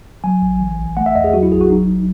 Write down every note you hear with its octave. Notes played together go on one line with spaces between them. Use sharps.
F#3 G#5
A1
E3
B1
A3 F#5
E5
E2 D#5
G#4
F#3 F#4
E4
G#1 G#4
F#4
F#3 D#4